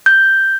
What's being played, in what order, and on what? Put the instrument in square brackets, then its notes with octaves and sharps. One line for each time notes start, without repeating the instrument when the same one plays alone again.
[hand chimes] G6